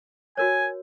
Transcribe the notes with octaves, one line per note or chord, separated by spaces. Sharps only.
F#4 A#4 C#5 G#5